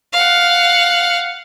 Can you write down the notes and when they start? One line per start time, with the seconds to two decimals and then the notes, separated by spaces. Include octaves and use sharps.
0.13 F5 F#5